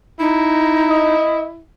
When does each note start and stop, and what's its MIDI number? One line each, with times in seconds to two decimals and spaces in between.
0.20 1.14 63
0.20 1.61 64
0.90 1.47 75